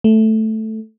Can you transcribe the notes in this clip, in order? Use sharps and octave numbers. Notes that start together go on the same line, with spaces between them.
A3